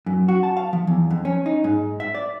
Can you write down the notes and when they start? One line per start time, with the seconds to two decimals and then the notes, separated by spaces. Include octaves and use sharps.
0.06 F#2
0.28 F#4
0.43 A5
0.57 F5
0.73 F3
0.87 E2
1.10 F2
1.25 C#4
1.46 D#4
1.64 G#2
2.00 E5
2.15 D5